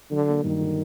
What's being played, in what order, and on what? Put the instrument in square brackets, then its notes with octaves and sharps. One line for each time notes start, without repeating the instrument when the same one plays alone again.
[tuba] D3 [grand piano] F#3
[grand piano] A#3
[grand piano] G2 [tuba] D#3
[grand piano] D3